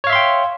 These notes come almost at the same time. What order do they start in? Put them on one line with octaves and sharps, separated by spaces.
C#5 F5 E5 C6 G5